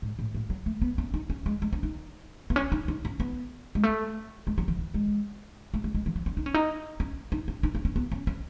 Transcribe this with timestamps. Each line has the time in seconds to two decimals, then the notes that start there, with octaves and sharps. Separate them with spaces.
0.02 G#2
0.19 A2
0.35 A2
0.50 F#3
0.66 A3
0.82 B3
0.98 C#4
1.14 D#4
1.30 C#4
1.46 G#3
1.62 G#3
1.73 C#4
1.83 D#4
2.50 B3
2.56 C#4
2.72 D#4
2.88 D#4
3.05 C#4
3.20 B3
3.75 G#3
3.83 A3
4.47 G#3
4.58 F#3
4.68 E3
4.79 E3
4.94 G#3
5.74 A3
5.84 G#3
5.94 G#3
6.06 E3
6.16 F#3
6.26 C#4
6.37 D#4
6.46 C#4
6.54 D#4
7.00 C#4
7.32 D#4
7.48 C#4
7.63 D#4
7.75 C#4
7.85 C#4
7.96 B3
8.12 C#4
8.27 C#4